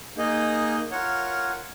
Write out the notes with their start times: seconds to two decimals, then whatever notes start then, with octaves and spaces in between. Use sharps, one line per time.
0.17 A#3 D#4 G#4 D#5
0.91 F4 A#4 C#5 F#5